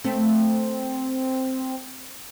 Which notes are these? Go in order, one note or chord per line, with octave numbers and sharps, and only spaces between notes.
A3 C4